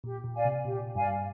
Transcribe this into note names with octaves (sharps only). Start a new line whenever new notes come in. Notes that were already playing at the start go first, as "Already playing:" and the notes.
A#2 G4
A#2
D5 F5 G#5
C3
A#2 G4
G2 D5 F5 G#5